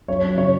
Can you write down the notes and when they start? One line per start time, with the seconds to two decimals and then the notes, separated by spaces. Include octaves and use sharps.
0.08 F#2 C#5
0.23 F#2
0.37 C#3 C#5